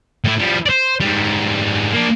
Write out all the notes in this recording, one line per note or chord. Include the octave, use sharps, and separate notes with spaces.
A2 E4
F3 G3
C5 D5
G#2 G3
A#3 D4